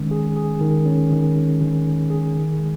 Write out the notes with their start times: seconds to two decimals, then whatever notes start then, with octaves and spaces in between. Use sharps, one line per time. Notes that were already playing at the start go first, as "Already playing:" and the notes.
Already playing: D#3 G#3 C#4
0.11 G#4
0.37 G#4
0.61 D#3
0.86 C#4
1.11 D#3
1.35 C#4
1.61 D#3
1.85 D#3
2.10 G#4
2.35 D#3
2.59 G#3